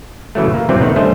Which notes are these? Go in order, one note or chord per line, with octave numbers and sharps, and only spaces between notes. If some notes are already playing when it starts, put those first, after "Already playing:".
C#3 E3 F#3 A3
A#3
C3 E3 F#3 G3 C4
D#3 A3 B3
G3 A3 C#4 D4 C5 D#5